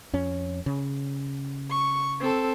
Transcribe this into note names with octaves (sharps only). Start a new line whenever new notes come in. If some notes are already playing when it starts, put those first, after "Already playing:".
F2 C#4
C#3
C#6
C4 A4